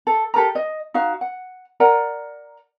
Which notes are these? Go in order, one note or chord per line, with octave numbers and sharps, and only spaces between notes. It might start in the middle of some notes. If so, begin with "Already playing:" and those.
A4
G4 A4 A#4 A#5
D#5
D#4 F#4 F5
F#5
A#4 D5 F#5 A#5